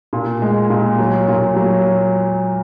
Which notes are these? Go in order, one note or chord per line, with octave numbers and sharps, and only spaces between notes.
A#2
G#3
A#2
F#3
A#2
F#3